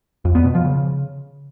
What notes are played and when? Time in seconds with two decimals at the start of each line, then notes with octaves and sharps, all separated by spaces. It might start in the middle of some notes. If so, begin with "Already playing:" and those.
0.25 F2
0.35 B3
0.45 B2
0.55 F3
0.65 C#3